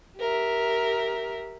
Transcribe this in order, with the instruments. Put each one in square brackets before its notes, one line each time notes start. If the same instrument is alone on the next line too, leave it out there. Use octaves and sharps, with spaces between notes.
[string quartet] G4 A#4 E5